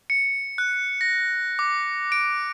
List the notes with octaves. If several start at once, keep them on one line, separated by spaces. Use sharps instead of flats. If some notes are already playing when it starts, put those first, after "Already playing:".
C#7
F#6
A#6
D6
D7